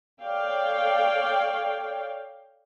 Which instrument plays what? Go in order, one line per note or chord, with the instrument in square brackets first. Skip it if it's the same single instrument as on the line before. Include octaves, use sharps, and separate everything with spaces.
[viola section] A4 C#5 D5 F5 G5